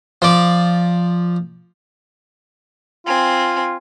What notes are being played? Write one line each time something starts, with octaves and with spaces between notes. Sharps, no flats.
F3 D5
C4 F4 G#5